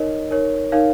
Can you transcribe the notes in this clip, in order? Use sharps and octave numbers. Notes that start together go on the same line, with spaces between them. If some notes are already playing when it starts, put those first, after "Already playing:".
Already playing: D#4 A#4 C#5 D#5
D#4 A#4 C#5
D#4 A#4 C#5 F5